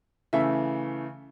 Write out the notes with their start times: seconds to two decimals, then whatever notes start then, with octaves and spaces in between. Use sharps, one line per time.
0.33 C#3 E3 A3 E5